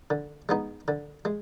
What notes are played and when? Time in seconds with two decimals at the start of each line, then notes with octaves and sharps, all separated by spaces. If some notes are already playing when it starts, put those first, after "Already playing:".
0.10 D3
0.49 G#3 B3 D#4
0.88 D3
1.25 G#3